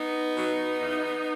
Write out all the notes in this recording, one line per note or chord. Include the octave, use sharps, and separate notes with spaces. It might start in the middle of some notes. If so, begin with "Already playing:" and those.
Already playing: B3 D#4
B2 F#3
E2